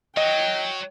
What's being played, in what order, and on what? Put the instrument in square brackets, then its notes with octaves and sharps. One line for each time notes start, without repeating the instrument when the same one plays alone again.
[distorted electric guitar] F#3 [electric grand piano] D#5 [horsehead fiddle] G5